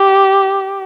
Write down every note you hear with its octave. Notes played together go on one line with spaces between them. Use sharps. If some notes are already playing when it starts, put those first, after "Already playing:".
Already playing: G4